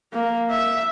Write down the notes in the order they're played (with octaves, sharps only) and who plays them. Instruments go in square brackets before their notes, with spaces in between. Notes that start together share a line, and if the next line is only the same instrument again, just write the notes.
[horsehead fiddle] A#3
E5